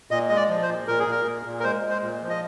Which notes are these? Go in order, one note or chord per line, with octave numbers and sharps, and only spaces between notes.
A#2 D#5
G#3 D#5
D5
F3
C5
A#2
A#2 A#4
G#4
A#2 A#4
A#2
A#2
A#4
G#3 C5
G#3
C5
A#2
F3
D#5